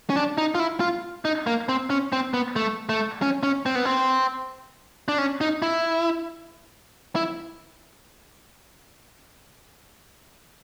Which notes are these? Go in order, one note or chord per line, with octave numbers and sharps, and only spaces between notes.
C#4
D4
D#4
F4
E4
F4
D#4
A#3
C4
C#4
C4
B3
A3
A3
C#4
C#4
C4
B3
C4
D4
C#4
D#4
E4
E4